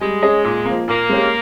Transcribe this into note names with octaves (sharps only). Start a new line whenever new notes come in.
G3 G#3
C#4 G#4 D#5
A#2
F3 A#3
A#2 A#3
G#3 C#4 G4